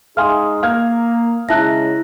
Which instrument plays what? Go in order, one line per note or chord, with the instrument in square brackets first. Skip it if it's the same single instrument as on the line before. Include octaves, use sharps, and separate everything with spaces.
[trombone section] G#3 D#4 G#4 [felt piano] F5 G#5 D#6 [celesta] C6 F6
[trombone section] A#3 [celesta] F5 [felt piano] F6 G#6
[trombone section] C#3 G#3 [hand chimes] E4 A#6 [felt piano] E5 A5 F#6